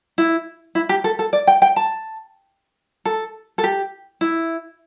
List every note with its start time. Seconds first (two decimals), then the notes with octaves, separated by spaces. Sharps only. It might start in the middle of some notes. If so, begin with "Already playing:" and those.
0.18 E4
0.75 E4
0.89 G4
1.04 A4
1.19 A4
1.33 D5
1.47 G5
1.62 G5
1.76 A5
3.05 A4
3.58 A4
3.64 G4
4.21 E4